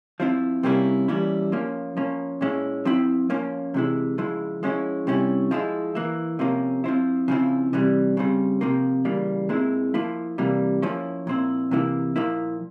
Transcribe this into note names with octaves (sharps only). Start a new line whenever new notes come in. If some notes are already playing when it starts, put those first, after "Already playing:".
F3 C4 E4
C3 G3 A#3 C#4 E4
E3 G3 A#3 C#4 E4
F3 A#3 C#4
F3 A#3 C#4
A#2 G#3 C#4 E4
F3 C4 E4
F3 A#3 C#4
C3 E3 G#3 E4
C#3 F3 G#3 E4
F3 G#3 C#4 E4
C3 G3 C#4 E4
F3 G#3 E4
E3 A#3 E4
C3 F3 A#3 C#4
F3 C4 E4
C#3 F3 C4 E4
C3 E3 G3
C#3 G3 C4
C3 F3 A#3
C#3 E3 G3 A#3
A#2 G#3 C4 E4
F3 A#3 E4
C3 E3 G3 A#3
F3 A#3 C#4 E4
A#2 F3 C4 E4
C3 E3 A#3 E4
A#2 F3 A#3 E4